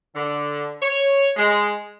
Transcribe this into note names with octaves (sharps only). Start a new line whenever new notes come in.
D3
C#5
G#3